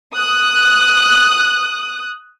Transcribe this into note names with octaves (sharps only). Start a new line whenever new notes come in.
D#6 F#6